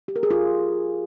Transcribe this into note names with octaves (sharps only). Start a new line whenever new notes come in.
G4
A#4
G#4
F4